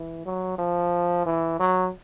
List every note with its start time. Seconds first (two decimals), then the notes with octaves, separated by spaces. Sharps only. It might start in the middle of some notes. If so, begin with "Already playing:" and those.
Already playing: E3
0.25 F#3
0.58 F3
1.26 E3
1.59 F#3